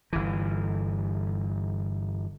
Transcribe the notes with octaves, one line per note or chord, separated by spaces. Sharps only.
G1 E3